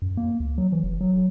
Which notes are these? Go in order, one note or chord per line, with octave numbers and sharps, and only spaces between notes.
F#2
A#3
D2
F#3
E3
F1
F#3